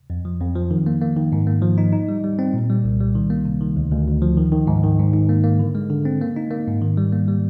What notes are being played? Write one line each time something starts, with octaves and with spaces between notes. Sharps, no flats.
F2
F3
F2
F3
D#3
A#3
A#3
D#3
G#2
A#3
F3
D#4
D#4
G3
G3
C4
A#2
G3
C2
G3
D#3
A#3
C3
D#3
D2
D2
D2
F3
D#3
D#3
G#2
D#3
G#2
G#2
A#3
A#3
D3
G#3
D3
C4
A#3
D#4
A#3
G#2
D#3
G3
A#3
G3